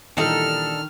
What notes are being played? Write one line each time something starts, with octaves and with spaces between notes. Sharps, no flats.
A#2 D#3 E3 G3 D4 D#4 A4 F6